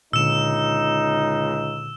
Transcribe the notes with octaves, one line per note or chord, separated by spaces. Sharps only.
C#2 A#2 D3 D#4 E6 E7